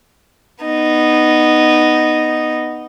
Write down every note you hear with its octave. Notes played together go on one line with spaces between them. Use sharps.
B3 D#4